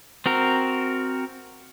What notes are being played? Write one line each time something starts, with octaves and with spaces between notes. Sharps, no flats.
C4 F#4 A#4